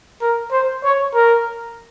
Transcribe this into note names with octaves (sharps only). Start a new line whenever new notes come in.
A#4
C5
C#5
A#4